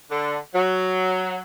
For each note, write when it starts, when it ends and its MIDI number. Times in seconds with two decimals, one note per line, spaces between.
0.10 0.37 50
0.54 1.42 54